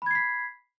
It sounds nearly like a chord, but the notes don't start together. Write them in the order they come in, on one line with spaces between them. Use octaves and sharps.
B5 G#6 C7 B6